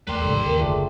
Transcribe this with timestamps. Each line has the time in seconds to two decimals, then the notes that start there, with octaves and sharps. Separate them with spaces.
0.07 E2 A3 A#4 B4 D5 G5 C6
0.21 A1 G#2 C#3 G3 A4 E6
0.45 D#2 A#4
0.59 F#1 D2 A3 D4 F4 G#4